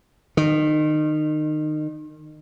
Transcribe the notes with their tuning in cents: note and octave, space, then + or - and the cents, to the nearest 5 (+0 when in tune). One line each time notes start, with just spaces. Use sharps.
D#3 -25